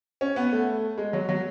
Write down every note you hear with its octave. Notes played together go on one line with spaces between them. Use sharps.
C#4
B3
A3
G#3
F#3
F#3